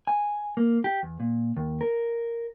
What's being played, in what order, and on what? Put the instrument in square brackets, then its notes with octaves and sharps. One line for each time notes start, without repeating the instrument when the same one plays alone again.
[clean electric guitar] G#5
A#3
G4
E2
A#2
D#2
A#4